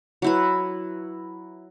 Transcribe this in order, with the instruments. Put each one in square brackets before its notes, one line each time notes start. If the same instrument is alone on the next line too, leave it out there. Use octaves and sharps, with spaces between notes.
[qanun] F#3 E4 B4